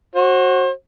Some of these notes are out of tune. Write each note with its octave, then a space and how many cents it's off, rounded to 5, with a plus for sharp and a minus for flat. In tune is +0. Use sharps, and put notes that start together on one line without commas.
F#4 +0 C5 +35